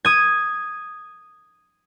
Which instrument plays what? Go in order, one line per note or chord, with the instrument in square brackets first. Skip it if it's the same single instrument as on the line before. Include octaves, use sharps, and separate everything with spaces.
[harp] D#6 G#6